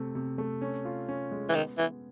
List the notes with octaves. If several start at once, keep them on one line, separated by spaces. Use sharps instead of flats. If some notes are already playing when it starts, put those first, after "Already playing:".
Already playing: C3 A3
C3
A3
C#4
F4
C#4
G#3
E3
D#3 B3
E3 B3